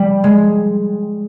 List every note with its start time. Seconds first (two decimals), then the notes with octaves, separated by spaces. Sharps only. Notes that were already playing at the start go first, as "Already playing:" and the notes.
Already playing: G3
0.24 G#3